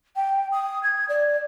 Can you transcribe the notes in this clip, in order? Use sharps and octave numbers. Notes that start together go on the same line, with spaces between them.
G5
D#6
G#6
D5